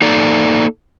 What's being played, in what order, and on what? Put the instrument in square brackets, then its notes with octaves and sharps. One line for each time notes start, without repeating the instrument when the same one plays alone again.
[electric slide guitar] A#3 D#4 A4 D5